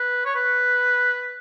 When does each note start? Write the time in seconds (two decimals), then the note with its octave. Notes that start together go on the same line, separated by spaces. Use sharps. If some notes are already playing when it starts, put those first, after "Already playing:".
Already playing: B4
0.25 C#5
0.36 B4